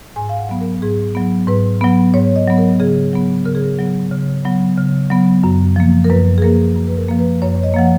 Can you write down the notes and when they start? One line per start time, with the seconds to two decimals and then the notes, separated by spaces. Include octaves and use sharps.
0.16 G#2 G#5
0.29 F5
0.39 F#5
0.49 F#3 B3
0.61 A#4
0.82 G#2 G#4
1.15 F#3 B3
1.47 G#2 B4
1.81 F#3 B3
2.14 G#2 C#5
2.36 D#5
2.48 F#3 B3
2.58 A#4
2.80 C#3 G#4
3.13 F#3 B3
3.45 C#3 A#4
3.55 G#4
3.64 A#4
3.79 F#3 B3
4.12 C#3
4.45 F#3 B3
4.77 C#3
5.10 F#3 B3
5.44 F#2
5.76 F3 A#3
6.04 A#4
6.10 F#2 B4
6.38 G#4
6.42 F3 A#3 A#4
6.76 F#2
6.87 B4
6.97 A#4
7.08 F3 A#3
7.19 B4
7.42 F#2 C#5
7.55 C#5
7.63 D#5
7.74 F3 A#3 F#5